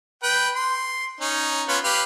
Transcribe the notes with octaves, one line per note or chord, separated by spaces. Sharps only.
B4 G5
C6
C#4 D#4
B3 C#4 F4
G4 B4 F5